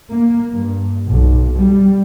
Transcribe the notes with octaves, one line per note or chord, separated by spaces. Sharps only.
A#3
G2
B1
G3